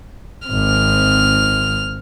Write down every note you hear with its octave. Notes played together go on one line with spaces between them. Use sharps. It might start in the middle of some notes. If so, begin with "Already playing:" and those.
G#1 C4 F6